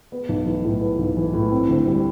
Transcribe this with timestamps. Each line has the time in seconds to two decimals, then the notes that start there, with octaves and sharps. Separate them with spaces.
0.12 B3
0.29 B1
0.46 E3
0.64 A2
0.81 B3
0.99 B1
1.17 E3
1.34 A2
1.52 C4
1.69 D2
1.87 G3